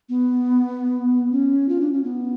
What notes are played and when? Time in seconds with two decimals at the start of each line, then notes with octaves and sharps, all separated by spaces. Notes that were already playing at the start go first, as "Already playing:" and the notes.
0.09 B3
1.32 C#4
1.69 F4
1.81 D4
1.93 C#4
2.04 B3